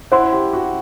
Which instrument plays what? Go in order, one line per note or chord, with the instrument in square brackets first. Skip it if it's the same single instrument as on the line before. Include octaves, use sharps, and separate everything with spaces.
[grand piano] E4 [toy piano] C5 F#5 C6
[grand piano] G4
F#4